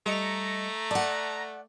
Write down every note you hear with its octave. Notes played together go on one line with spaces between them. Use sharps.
G3 A3 D#5 A#5 C#7
D5 F#5 A5